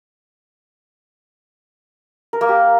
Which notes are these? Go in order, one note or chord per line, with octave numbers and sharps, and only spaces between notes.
A#4
A#3
G4